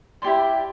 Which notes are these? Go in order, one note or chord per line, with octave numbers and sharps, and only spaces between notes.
E4 G4 D5 C6